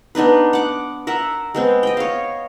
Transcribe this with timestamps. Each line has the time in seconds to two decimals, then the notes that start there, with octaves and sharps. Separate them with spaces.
0.15 B3 D4 D#4 B4
0.53 F#5 D6
1.07 A#4 E5 F#5
1.55 G#3 B3 C4
1.83 D#5 G5
1.97 C#5 F5